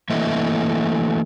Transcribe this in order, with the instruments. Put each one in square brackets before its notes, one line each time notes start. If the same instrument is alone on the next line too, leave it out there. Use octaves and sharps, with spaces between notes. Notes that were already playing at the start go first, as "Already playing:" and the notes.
[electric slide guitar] E3 A3 A#3 E4 D#5 E5